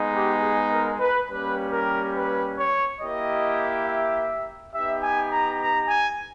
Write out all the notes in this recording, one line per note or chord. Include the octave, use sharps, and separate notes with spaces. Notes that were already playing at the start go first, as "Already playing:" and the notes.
Already playing: G#3 B3 D#4
G4
G#4
A#4
B4
G3 A#3 C#4 G4 B4
A#4
B4
C#5
A#3 E4 G4 D#5
E5
B3 D#4 G4 E5
G#5
A#5
A#5
G#5